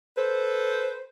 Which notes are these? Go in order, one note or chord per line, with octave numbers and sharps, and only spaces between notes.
A4 B4 C5